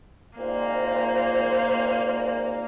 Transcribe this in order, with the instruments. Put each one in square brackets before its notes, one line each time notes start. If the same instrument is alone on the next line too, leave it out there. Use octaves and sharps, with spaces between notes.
[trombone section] G#1 A#2 [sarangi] A#3 [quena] C5